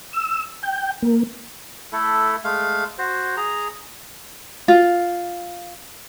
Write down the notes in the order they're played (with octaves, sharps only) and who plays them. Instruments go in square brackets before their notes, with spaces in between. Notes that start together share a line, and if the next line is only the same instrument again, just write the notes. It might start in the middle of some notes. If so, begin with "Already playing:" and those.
[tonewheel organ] E6
G5
A#3
[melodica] A3 E4 A4
G#3 A3 F5
F#4 C5
G#4 A#5
[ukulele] F4